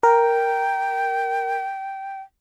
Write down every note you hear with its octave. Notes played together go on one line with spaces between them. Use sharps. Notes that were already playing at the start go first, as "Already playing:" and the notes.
A#4 G5